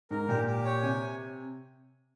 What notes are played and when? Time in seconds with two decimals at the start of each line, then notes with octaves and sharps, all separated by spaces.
0.11 G#2 A#4
0.29 A#2 G4
0.46 G4
0.65 C#5
0.82 C3 G#5